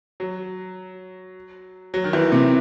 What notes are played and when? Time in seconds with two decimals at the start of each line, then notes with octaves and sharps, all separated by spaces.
0.20 F#3
1.94 F#3
2.04 D#3
2.13 E3
2.32 C3